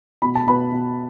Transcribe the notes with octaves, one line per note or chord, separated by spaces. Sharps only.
B2 B5
A5
B2 B4 B5
B2